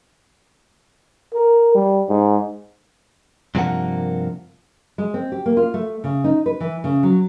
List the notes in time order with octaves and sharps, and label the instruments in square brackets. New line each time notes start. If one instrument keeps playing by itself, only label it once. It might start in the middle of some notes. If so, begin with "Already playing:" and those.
[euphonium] A#4
G3
G#2
[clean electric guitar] G2 C3 F3 A#3 A#4 F#5
[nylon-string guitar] G#3
C4
G4
A#3
F4
A3
C#3
D#4
B4
E3
C#3
F#3